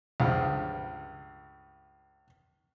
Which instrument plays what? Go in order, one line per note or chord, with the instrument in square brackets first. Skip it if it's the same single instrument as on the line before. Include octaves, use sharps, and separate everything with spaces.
[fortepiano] C#2 G2 F3